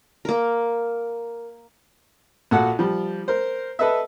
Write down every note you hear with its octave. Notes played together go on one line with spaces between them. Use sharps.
A#3 A#4
A#1 F#4 A4 F#5
F3 G3
A#4 C5
A4 B4 D#5 E5